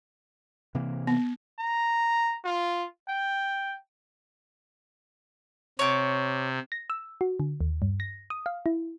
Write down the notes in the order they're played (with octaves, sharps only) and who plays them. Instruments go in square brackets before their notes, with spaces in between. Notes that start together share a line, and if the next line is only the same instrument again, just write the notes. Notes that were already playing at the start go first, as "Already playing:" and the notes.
[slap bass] C3 E3 A#3
[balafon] B3
[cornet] A#5
F4
G5
[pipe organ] C3 [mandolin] C#5 D6
[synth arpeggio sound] A#6
E6
F#4
D3
D#2
G2
A#6
D#6
F5
E4